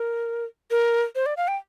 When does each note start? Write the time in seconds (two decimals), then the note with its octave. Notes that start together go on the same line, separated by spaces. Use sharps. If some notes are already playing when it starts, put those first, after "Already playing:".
Already playing: A#4
0.71 A#4
1.15 C5
1.26 D5
1.37 F5
1.48 G5